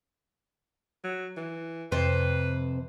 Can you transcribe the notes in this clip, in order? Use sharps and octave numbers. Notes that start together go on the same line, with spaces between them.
F#3
E3
F2 C3 B4 C5